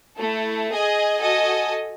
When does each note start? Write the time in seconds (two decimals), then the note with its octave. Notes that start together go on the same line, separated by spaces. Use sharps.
0.17 A3 E4 A4
0.69 G#4 D#5 G#5
1.20 F#4 A4 D#5 G#5